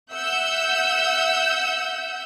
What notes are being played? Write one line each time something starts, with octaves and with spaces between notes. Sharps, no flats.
E5 F#5 E6 G6